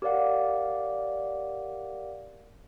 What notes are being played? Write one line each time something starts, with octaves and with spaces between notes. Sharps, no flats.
G4 A#4 C#5 D5 F5 F#5